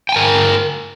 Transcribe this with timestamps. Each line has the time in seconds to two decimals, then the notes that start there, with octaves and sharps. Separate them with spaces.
0.09 G5
0.12 G#5
0.16 A#4